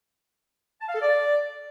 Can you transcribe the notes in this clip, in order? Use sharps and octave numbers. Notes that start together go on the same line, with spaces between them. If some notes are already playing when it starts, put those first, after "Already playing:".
A5
F5
A4
D5